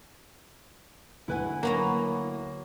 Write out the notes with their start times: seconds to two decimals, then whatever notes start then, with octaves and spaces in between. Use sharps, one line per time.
1.28 D2 E4 B4 F#5 G#5
1.63 F#3 A#3 B3 A#5